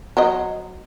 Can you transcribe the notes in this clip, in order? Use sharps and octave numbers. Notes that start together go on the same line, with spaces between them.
F#3 C5 D#5